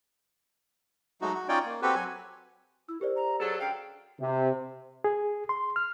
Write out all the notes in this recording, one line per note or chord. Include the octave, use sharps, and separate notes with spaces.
F#3 G#3 A3 D#4 F#4
F#4
C#4 D#4 F4 C#5 D5 G5
A#3
C4 F#4 G4 A4 B4
F#3 G#5
E4 E6
G4 A#4 C5 D5
A#5
F#3 G#4 A4
F#2 D3 F5 G5
C3
G#4
C6
F6